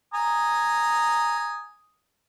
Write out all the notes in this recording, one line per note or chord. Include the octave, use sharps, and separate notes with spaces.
G#5 A#5 D#6